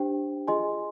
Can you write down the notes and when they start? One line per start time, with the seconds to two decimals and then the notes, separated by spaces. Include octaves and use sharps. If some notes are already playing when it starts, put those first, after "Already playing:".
Already playing: D4 G4 C5 G5
0.48 F4 G#4 D#5 G#5 C6